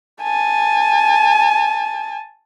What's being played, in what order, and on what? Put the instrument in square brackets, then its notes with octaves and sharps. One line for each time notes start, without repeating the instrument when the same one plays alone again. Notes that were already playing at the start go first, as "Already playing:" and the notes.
[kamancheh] G#5 A5